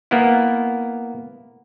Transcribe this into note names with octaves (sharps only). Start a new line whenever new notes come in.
A#3 B3 E4